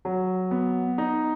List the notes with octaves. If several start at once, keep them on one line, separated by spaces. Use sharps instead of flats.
F#3
B3
D#4